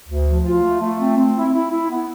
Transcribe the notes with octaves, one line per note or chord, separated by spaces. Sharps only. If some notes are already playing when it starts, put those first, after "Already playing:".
D2
F3
F4
A3
A3
C4
C4
E4
E4
E4
B3